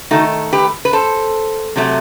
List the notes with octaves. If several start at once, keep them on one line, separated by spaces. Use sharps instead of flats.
D#3 A3 D#4 F#4
G4 B4
B4
A4 C5
C3 F#3 A3